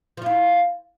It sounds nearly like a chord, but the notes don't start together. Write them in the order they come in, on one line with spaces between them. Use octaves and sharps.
F3 F4 E4